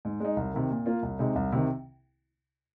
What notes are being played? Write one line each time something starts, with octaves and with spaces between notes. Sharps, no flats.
G#2
G#3 D#4
C2
C3 D#3
A#2
A#3 F4
C2
C3 G#3 D#4
C2
C3 D#3